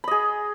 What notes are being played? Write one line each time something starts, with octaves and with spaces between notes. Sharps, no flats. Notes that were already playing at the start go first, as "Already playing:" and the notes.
G#4 D#5 B5